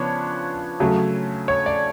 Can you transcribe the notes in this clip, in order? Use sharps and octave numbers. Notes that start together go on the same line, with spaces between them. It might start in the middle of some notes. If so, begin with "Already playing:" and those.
Already playing: C#3 F3 B3 D4 C#5
C#3 F#3 A3
C#5
D5